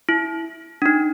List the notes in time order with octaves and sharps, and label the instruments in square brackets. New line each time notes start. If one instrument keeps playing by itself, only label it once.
[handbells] E4
D4
D#4